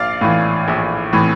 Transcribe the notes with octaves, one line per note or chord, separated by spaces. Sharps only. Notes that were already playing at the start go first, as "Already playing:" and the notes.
Already playing: A#1 D5 F5
A2 E3
A#1
A2 E3